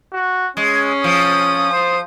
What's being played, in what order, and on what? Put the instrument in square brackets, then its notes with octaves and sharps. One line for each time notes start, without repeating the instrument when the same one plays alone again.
[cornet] F#4
[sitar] G#3 [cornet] C#4
[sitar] F3 [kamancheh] D#6
[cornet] C5